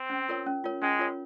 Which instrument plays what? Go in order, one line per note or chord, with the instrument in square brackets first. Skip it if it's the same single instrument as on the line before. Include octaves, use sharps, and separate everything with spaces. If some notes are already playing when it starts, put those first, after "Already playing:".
Already playing: [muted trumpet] C4
[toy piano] C#4
F4 A#4 C#5
C#4
F4 A#4 C#5
[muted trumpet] G#3 [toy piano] C#4
[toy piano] F4 A#4 C#5